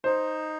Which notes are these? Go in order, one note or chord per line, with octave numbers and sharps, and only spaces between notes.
D#4 C5